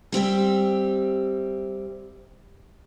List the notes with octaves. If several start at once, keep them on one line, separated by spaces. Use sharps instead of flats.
G3 C4 G4 E5